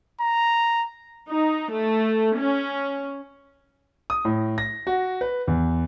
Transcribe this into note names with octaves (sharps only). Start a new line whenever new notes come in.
A#5
D#4
A3
C#4
D#6
A2
A#6
F#4
B4
E2